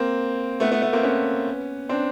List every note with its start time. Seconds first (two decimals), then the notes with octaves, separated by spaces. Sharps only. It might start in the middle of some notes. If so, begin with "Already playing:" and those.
Already playing: A#3 C4
0.60 A3 B3
0.72 A3 B3
0.82 A3 B3
0.93 A#3 C4
1.03 B3 C#4
1.89 C4 D4